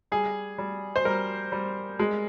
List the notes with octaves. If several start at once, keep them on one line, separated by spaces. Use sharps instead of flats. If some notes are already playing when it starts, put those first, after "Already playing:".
G3 G#4
G3
C5
G3 A#4
G3
G#3